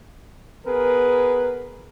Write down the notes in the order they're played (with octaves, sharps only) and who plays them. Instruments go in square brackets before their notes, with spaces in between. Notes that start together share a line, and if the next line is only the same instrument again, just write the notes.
[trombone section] B3 G#4 A#4 B4